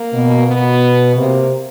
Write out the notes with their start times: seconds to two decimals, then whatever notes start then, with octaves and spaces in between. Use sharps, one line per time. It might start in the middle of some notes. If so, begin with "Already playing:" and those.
Already playing: A#3
0.13 B2
0.48 B2 B3
1.16 C3 A#3